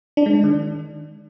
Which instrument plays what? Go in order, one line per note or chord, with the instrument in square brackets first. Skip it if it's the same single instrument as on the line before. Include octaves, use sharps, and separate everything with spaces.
[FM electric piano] D4
G#3
D4
D#3